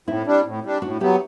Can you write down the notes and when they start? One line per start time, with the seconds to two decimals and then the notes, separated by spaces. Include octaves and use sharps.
0.07 A2 C4 E4
0.26 G3 D4
0.45 A2
0.64 G3 D4
0.82 A2 D4 F#4
1.01 F#3 B3 E4 G4